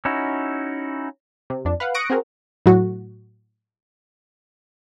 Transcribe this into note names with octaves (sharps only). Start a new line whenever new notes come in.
C#4 D#4 E4 F#4
C3
F2 D4
B4 F5 F#5
C#6 D#6 F#6 A#6 C#7 D7
C4 F#4 G#4 A#4
A2 F#3 F#4